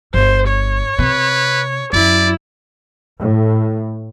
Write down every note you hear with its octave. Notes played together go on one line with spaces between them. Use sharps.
G1 C5
C#5
C3 B4
F#2 F#3 E4 D5
A2